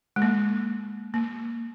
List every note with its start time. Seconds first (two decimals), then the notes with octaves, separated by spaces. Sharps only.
0.16 G#3
0.22 A#3
1.14 A#3